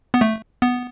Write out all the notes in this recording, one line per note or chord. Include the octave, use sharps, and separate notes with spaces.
B3
A3
B3